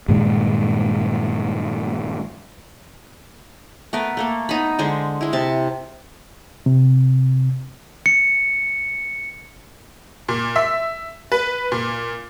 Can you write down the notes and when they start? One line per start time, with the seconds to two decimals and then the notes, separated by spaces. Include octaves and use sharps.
0.09 G2 A#2 D#3 G#3
3.93 A3 B3 A#4 B4
4.17 A3 A#3 A4
4.49 B3 D#4 B5
4.79 D3 G#3 G#4 C5
5.21 G#3 E4
5.33 C3 A5
6.66 C3
8.06 C#7
10.29 A#2
10.56 E5
11.32 B4
11.72 A#2